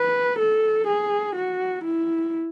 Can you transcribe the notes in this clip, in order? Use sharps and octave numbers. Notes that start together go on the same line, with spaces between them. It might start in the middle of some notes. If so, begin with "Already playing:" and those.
Already playing: B4
A4
G#4
F#4
E4